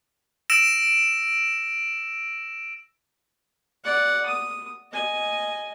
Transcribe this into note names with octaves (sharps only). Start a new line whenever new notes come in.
E6 A#6 D7 E7
D5 F#5
D#6
D#5 G#5